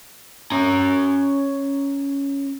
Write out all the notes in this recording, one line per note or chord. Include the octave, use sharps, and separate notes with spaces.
C#4 A#5